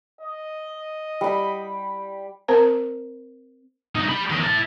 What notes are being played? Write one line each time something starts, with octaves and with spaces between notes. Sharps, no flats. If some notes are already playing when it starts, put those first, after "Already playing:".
D#5
G3 B5
C4 A#4 C5 A#5
C2 D#4
G4 B5
E2 D#3
E4 A5